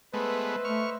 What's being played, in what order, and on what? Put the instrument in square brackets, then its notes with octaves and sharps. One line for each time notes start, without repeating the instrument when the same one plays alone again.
[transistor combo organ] G#3 A3 B3 [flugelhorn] B4 [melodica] C5 D#5 E5
[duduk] A3 [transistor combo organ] C#6 F6